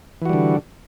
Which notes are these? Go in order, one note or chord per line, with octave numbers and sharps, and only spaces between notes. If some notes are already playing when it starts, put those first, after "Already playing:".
D3 E3 G3 F#4